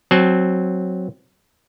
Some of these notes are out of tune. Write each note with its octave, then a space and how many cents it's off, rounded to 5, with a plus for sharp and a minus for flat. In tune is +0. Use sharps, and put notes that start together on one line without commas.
F#3 +0 C4 +0 A5 -40